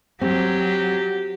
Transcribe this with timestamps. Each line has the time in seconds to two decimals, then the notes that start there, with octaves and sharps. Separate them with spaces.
0.21 F#3 C4 G4